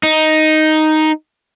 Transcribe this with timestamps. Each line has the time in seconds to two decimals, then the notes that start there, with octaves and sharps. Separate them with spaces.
0.03 D#4